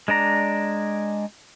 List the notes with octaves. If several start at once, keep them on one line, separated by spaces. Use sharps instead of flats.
G#3 D4 D5 A#5